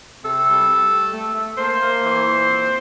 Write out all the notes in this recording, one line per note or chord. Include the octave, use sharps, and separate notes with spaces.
C3 A4
G3
G3
A3
A3
A3
A#3 C5
A#3
E3
A#2
C4